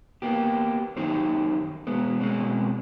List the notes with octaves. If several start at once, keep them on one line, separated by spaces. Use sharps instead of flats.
A#3 B3 G4
F#2 D#3 D#4 G4 C5
B2 G#3 B3
B2 G#3 C4 C#4